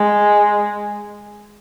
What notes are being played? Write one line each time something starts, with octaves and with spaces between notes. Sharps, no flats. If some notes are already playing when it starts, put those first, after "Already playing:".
Already playing: G#3